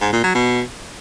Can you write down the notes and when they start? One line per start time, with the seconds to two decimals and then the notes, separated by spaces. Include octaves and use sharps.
0.01 G#2
0.12 A#2
0.23 F#3
0.35 B2